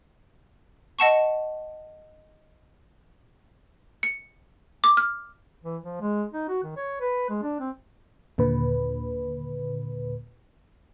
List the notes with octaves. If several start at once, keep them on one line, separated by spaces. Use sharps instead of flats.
D#5 F#5 A5 C#6
C#7
D6
F6
E3
F3
G#3
D#4
F#4
D#3
C#5
B4
G#3
D4
C4
D#2 A#2 D3 B4